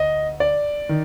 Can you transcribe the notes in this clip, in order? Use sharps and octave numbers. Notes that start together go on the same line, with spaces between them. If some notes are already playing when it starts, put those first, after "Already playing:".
Already playing: D2 D#5
D5
D#3